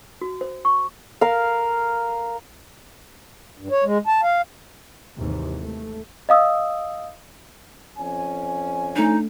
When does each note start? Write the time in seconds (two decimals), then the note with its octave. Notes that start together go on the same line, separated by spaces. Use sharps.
0.21 F#4
0.41 C5
0.65 C#6
1.21 A#4 F5
3.58 G2
3.71 C#5
3.84 G#3
4.07 A5
4.23 F5
5.17 G#1 D#2 G#2 C3 E3
5.62 A3
6.29 D#5 F5 D#6 E6
7.98 F2 C#4 G#5
8.96 A3 D4 D#4